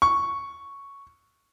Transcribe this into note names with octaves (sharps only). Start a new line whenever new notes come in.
C#6